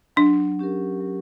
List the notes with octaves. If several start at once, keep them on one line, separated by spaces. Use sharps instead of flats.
F#3 D4
C#4 G4 A#4
F#3